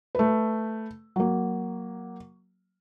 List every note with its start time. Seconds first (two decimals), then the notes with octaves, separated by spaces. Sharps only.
0.15 A3 B4
1.16 F#3 A#3